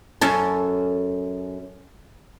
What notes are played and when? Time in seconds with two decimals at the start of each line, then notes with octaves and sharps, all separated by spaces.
0.21 F#2 C#4 A4